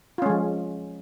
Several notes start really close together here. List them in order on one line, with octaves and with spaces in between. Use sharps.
F4 C#4 G#3 F3